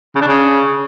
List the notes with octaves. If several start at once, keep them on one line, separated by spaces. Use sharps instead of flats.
C#3
D4
C#3